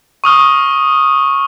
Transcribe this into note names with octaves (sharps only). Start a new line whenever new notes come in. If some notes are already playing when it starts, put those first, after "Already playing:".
C#6 D#6 F6